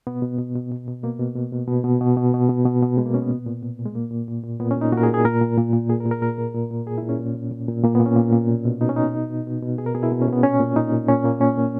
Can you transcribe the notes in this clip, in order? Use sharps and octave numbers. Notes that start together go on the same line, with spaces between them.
B2 B3
B2
B2
B2
B2
B2
B2 A#3
B2
B2
B2
B2 B3
B2
B2
B2
B2
B2
B2
B2
B2 G#3
A#3
B2 C#4
B3
A#2
A#2
A#2
A#2
G#3
A#2 A#3
A#2
A#2
A#2
A#2 B3
C#4
A#2 D#4
A#2 F#4
A#4
G#4
A#2
G#4
A#2 A#4
A#2
A#2
A#2
A#2 G#4
A#4
A#2
A#4
A#2 A#4
A#2
A#2
A#2
A#2 G#4
E4
A#2
C#4
A#2
A#2
A#2
A#2
A#2 A#3
B3
A#2
C#4
A#2
A#2
B2
B2
B2 D#4
C#4
B2 D#4
B2
B2
B2
B2
B2 G#4
A#4
B2 G#4
E4
B2
C#4
B2 B3
A#2 C#4
A#2
A#2 D#4
A#2
A#2 C#4
A#2 A#3
A#2 C#4
A#2